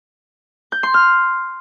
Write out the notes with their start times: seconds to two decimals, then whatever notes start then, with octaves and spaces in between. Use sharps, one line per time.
0.72 G6
0.83 C6
0.94 F6